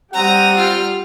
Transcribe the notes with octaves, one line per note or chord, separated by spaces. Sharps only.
G3 C4 G4 F#5 A#5 D#6
F4 F6